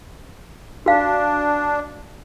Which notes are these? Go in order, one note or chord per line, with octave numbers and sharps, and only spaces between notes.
D4 F#4 F5